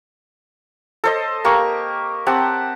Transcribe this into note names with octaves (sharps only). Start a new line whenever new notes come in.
A4 C5 D#5
A#3 G4 C#6
C4 G4 F#5 A5